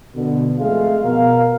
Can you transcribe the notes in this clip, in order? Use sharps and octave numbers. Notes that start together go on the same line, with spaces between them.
B2 D3
F2 G#3 A3 F5
B2 A#4 F5